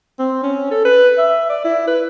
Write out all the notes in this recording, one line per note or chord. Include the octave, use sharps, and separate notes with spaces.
C4
C#4
A4
B4
E5
D5
E4
B4